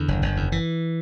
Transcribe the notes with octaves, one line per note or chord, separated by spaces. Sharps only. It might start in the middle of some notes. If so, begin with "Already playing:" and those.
Already playing: E2 D3
F#1
F#1
E2
E3